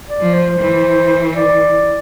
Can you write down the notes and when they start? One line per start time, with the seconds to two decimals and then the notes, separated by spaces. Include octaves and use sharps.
0.09 D5
0.21 F3
0.34 C5
0.59 E3
1.35 D5